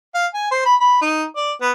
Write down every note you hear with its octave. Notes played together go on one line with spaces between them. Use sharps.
F5
G#5
C5
B5
B5
D#4
D5
B3